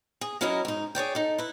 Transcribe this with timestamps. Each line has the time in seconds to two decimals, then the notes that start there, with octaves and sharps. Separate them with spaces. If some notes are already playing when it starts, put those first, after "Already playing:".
0.21 G#4
0.41 F#3 C#4 E4 F#4 A#4 D#5
0.65 G#2 D#4
0.95 G#4 C#5 D5 G5
1.15 D#4 A4
1.38 E4 B4